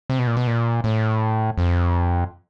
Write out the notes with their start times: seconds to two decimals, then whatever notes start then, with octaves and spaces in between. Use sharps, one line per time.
0.10 C3
0.19 B2
0.27 A#2
0.37 B2
0.47 A#2
0.84 A2
1.58 F2